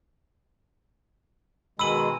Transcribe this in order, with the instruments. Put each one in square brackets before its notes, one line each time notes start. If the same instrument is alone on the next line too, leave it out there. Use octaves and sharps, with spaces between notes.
[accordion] B2 D#3 G#3 [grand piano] B5 F#7 [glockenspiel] E6 D#7